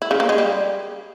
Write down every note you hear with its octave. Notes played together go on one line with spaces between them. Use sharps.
E4
C#3
A#3
G#3
G3